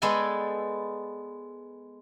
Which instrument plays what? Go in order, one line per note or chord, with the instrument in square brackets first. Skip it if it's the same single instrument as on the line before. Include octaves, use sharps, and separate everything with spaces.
[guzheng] G#3 B3 A4 D5 G5 G#5